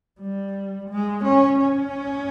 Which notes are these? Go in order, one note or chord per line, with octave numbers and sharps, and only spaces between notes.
G3
G#3
C#4
C#4